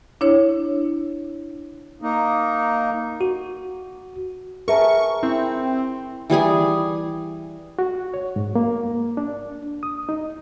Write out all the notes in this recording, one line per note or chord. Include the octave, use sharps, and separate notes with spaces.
D4 E4 C#5
A#3 D#4
F#4
G#4 A#4 B4 E5 A5 C#6
C4 E4
E3 G3 G#4 G#5
F#4
C#5
G#2
A#3
D4
D#6
D#4